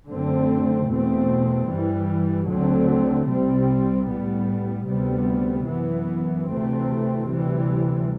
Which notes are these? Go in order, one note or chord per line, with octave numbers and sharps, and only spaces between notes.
F#2 D3 A3 C4
E2 B2 A3 C4
G2 E3 G3
D2 D3 F#3 A3 C4
C2 C3 G3 C4
A2 G3 B3
D2 C3 G3 B3
F#2 E3 B3
D2 C3 E3 A3 C4
D2 C3 E3 G3